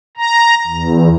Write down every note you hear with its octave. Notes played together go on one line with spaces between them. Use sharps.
A#5
E2